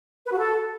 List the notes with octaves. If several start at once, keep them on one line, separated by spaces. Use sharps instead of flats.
B4
F#4
A4